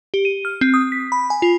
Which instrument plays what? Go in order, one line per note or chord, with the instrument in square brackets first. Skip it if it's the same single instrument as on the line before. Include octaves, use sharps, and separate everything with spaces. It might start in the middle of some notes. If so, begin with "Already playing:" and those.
[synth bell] G4
D#7
F6
C4
D#6
B6
B5
G#5
F4